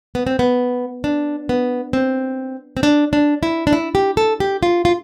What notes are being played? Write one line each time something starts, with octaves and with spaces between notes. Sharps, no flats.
B3
C4
B3
D4
B3
C4
C4
D4
D4
E4
D4
E4
G4
A4
G4
F4
F4